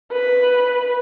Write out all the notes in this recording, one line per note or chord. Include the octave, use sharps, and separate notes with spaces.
B4